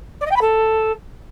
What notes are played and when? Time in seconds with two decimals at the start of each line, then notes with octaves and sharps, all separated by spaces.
0.21 D5
0.26 D#5
0.31 G5
0.36 B5
0.41 A4